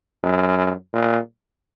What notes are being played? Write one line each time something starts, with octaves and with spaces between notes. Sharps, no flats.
F#2
A#2